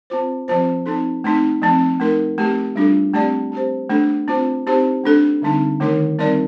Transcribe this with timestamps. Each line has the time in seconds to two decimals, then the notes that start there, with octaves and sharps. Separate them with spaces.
0.10 C4 F4 C5
0.48 F3 C4 F4 C5
0.86 C4 D#4 A4
1.24 A3 C4 D#4
1.62 F3 A3 C4
2.00 A3 D#4 A#4
2.38 A3 C4 G4
2.76 G3 D4 F4 A4
3.13 A3 C4 G4 D5
3.52 C4 G4 C5
3.90 A3 D4 A4
4.28 C4 F4 C5
4.67 C4 D#4 G4 C5
5.04 A3 D4 A4
5.42 D3 G3 C4 D#4
5.80 D#3 A3 D#4 A#4
6.19 G3 C4 D#4 A#4 D5